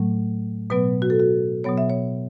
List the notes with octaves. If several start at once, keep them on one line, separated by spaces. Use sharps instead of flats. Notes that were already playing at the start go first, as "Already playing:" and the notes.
Already playing: A2 F#3 A3
B2 F#3 B3 B4
F#4
A4
F#4
B2 F#3 B3 C#5
E5
C#5